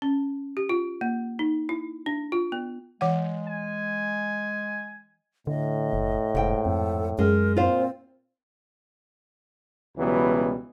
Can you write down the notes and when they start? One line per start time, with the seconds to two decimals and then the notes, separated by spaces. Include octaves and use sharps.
0.02 C#4
0.57 G4
0.69 F4
1.01 A#3
1.39 D#4
1.69 E4
2.06 D4
2.32 F4
2.52 B3
3.01 E3 G#3 F#5
3.47 G#5
5.47 A2 D3 D#5
5.93 F#1
6.35 F1 G#2 G5
6.66 F2 A4
7.19 F#2 G#3 A#4
7.57 A#2 C4 F4 C5
9.97 C#2 B2 E3 F#3 G3 B3